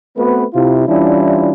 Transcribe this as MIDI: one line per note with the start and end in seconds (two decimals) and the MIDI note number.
0.17 0.44 57
0.17 0.44 59
0.17 0.44 60
0.17 0.44 66
0.17 0.44 71
0.54 0.87 48
0.54 0.87 64
0.54 0.87 65
0.88 1.52 52
0.88 1.52 55
0.88 1.52 61
0.88 1.52 62
0.88 1.52 64
0.88 1.52 65